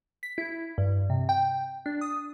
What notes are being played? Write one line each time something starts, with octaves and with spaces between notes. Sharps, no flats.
B6
E4
G2
C3
G5
D4
D#6